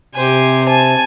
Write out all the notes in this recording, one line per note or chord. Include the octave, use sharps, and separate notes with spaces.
C3 G4 C5 G#5
G#5 A5